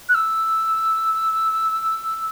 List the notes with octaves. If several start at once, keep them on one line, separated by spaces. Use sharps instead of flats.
F#6
E6